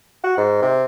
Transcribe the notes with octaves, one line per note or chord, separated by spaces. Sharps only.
F#4
G#2
C3